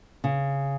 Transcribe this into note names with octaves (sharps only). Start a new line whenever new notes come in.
C#3